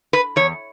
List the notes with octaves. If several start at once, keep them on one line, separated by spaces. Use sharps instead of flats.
B4
E2 C#5